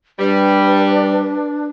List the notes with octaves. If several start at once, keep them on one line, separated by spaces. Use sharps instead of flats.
G3 D4 B4